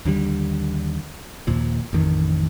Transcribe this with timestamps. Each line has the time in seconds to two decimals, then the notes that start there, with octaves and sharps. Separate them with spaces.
0.05 D#2 D3 E3 G3
1.47 D#2 A#2 F3
1.93 A1 F2 D#3